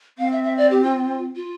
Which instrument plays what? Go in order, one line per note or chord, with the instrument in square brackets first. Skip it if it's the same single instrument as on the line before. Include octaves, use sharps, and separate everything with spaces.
[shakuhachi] C4 [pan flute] F5
[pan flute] E5
E5
D5
G4
F4
F4